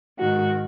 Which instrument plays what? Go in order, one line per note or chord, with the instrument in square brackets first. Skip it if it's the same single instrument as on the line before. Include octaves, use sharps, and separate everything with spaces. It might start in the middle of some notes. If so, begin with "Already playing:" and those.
[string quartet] G#2 D#3 F#4